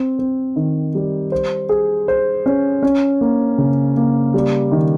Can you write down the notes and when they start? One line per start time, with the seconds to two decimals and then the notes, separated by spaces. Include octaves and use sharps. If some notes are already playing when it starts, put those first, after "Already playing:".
Already playing: C4
0.19 C4
0.56 D#3
0.95 G3
1.32 C5
1.69 G#4
2.08 C5
2.46 C#4
2.83 C#4
3.21 A#3
3.58 C#3
3.97 A#3
4.34 G3
4.72 D#3